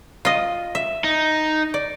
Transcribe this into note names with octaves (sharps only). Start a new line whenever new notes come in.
F4 D#5
E5
D#4
D5